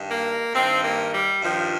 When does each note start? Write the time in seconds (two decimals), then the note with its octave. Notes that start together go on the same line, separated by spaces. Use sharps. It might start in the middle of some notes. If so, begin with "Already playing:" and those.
Already playing: G2 D#3
0.10 A#3
0.54 G2 D#3 C4
0.83 A#3
1.13 G3
1.42 G2 D#3 F3